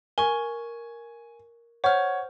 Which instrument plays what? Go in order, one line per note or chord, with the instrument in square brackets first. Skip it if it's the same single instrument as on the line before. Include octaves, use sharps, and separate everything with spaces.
[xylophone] A#4 C#6 [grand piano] G#5
[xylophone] C5 F6 [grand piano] C#5 [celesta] F#5